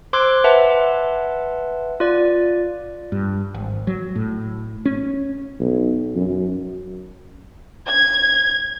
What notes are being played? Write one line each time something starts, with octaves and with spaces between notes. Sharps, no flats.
C5 C6 D6 E6 F#6 G#6
B4 E5 F#5 A5 C6
F4 D5
G2
G#1
F#3
A2
C#4
B1
F#2
G#6